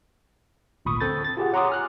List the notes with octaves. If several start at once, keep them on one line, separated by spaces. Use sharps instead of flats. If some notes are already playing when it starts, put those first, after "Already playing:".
G#1 D2 A#2 B5 C#6 D#6
D3 C4 A4 G6 A6
A6
F4 G4 G#4 F#5
C#5 F#5 A#5 C6 D6 D#6
G#5 F6 F#6